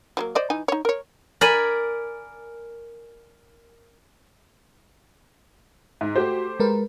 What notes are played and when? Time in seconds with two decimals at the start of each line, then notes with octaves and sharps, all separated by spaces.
0.17 F3 F#3 A#3
0.35 C5 D5 D#5
0.50 E3 D#4 G#5
0.68 D#4 C#5
0.85 A#4 C#5
1.41 A#4 D5 G#5 B5
6.01 G#2
6.16 A3 F#4 G4 C5
6.60 G#3 A#4 B4